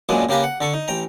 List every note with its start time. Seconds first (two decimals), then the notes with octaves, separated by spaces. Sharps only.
0.09 F#2 A#2 G#3 B3 D4
0.29 C#3 A#3 G4 A#4 B4
0.44 F#5
0.61 D3 A4 C#6
0.74 D#4
0.88 A1 G5 A#5